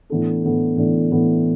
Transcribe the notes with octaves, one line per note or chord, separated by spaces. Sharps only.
A2 E3 B3 D4 A4
A2 E3 B3 D4 A4
A2 E3 B3 D4 A4
A2 E3 B3 D4 A4